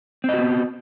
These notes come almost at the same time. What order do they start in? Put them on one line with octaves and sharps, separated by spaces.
C4 D#5 F#4 B3